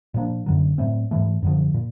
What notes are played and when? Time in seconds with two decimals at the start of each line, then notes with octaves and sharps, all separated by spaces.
0.14 A#2 F3 A#3 D4
0.46 F#2 D3 F#3
0.78 A2 F#3 A3 C4
1.11 G#2 E3 A3
1.42 F#2 D3 F3
1.74 A#2